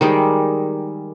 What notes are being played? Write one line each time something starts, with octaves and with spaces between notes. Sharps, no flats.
D#3 G3 G#3